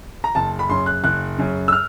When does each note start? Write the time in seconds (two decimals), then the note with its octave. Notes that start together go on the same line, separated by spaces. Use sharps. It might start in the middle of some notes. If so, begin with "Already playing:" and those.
0.24 A#5
0.35 F#1 A5
0.59 B5
0.70 F#2 C#3 C6
0.86 F#6
1.04 F#1 F#6
1.38 F#2 C#3
1.68 E6
1.72 F6